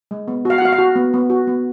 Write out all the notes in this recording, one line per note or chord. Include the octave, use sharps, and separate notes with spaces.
G#3
B3
F#4 F5
F#5
F#4 F5
F5
F#4
B3
B3
F#4
B3